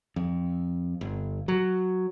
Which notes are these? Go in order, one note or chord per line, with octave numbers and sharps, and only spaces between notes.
F2
G1
F#3